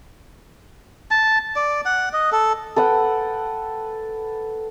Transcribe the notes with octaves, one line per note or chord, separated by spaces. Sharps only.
A5
D5
F#5
D#5
A4
A4 B4 F#5 G5